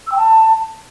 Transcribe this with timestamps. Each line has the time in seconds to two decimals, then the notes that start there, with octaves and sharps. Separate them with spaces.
0.07 E6
0.12 G5
0.17 A5